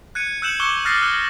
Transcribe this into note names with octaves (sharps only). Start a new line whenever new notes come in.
F#6 G#6 C#7 D#7
E6 F#6 G6 C#7 E7 F#7
C#6 D6 E6 F#6 C#7 G7
D#6 F6 F#6 A6 A#6 C7
E6 F#6